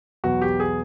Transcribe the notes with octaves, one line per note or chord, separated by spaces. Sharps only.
E2 B2 F#3 F#4
G4
G#4